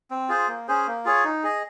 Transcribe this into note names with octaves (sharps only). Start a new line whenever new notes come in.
C4
F4 G#4 C5
A#3
C#4 G#4 C5
A#3
F4 G#4 C#5
D#4
G#4 D#5